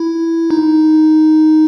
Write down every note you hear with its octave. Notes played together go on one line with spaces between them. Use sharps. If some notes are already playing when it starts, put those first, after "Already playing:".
Already playing: E4
D#4